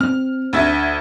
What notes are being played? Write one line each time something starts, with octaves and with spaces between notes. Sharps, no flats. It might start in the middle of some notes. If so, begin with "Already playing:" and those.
C4 F6
D2 E5 G#6